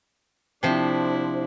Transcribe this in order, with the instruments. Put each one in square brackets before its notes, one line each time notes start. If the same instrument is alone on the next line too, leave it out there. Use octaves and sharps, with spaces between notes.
[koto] C3 F3 [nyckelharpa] D4 E4